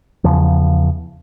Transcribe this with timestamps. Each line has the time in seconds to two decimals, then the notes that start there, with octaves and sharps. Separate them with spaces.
0.24 E2 C#3 F3